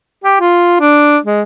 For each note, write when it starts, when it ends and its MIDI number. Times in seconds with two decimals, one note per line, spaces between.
0.24 0.36 67
0.41 0.78 65
0.80 1.18 62
1.24 1.42 56